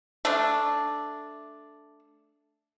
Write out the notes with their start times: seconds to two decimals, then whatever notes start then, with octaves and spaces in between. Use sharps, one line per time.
0.25 A3 D4